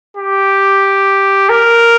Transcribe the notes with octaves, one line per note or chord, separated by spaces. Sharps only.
G4
A#4